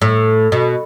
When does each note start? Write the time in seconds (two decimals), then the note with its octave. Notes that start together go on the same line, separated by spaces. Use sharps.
0.02 A2
0.52 B2